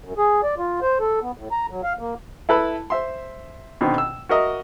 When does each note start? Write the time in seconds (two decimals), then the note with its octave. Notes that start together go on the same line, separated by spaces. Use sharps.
0.04 F#2
0.18 G#4
0.43 D5
0.58 F4
0.82 C5
1.00 A4
1.22 B3
1.38 A2
1.52 A#5
1.70 F#3
1.84 F5
1.99 A#3
2.49 E4 A4 B4 A5 B5
2.90 C5 E5 C6
3.81 B2 D3 D#3 C4
3.98 E6
4.29 F#4 A#4 D#5 E5